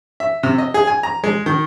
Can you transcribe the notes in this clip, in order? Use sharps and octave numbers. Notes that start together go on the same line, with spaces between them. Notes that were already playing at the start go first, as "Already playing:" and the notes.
E5
C3
D#5
G#4
G#5
A#5
G#3
D#3